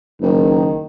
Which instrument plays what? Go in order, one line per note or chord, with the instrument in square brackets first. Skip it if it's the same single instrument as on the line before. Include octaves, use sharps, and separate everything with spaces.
[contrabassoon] F#1 [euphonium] D#3